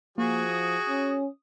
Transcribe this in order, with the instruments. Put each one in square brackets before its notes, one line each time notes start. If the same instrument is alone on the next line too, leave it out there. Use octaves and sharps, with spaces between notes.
[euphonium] F3 [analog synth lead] A#3 [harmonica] F#4 G#4
[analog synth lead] D#6
[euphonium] C#4